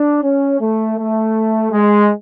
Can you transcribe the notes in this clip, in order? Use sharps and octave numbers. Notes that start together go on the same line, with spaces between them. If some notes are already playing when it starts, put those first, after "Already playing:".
Already playing: D4
C#4
A3
A3
G#3